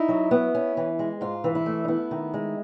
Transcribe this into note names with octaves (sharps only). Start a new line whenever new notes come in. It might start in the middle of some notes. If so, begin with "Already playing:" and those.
Already playing: D#4 E4
F#3
B3
C#4
E3
G#3
G#2 F4
E3
E4
A3
D#4
B3 E4
D#3
G#3